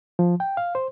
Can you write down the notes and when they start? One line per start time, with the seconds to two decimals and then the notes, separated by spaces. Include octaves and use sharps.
0.19 F3
0.40 G5
0.57 F5
0.75 C5